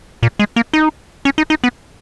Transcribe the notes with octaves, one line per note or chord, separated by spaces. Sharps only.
A#2
G#3
A#3
D#4
C#4
D#4
D#4
B3